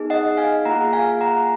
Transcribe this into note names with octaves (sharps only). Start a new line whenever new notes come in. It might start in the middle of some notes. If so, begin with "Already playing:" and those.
Already playing: B3 D#4 G#4
D#5 F#5
F5 G#5
A#3 F4 G#4 F#5 A#5
F5 G#5
F#5 A#5